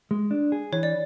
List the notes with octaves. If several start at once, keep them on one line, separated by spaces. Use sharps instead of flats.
G#3
D4
G#4
E3 C#5
D5